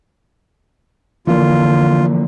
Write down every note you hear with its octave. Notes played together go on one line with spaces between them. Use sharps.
F2 D3 E3 F3 A#3 F4